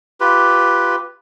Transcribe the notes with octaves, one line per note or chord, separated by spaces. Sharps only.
F4 G4 B4